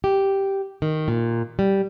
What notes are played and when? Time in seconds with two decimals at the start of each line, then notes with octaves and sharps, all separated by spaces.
0.04 G4
0.82 D#3
1.08 A#2
1.59 G3